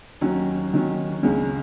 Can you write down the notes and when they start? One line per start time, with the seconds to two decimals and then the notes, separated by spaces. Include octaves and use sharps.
0.21 D#2 D#3 F#3 C#4
0.73 D#2 D#3 F#3 C#4
1.23 C#2 C#3 G#3 C#4